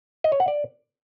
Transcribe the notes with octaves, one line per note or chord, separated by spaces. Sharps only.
D#5
C#5
F#5
D5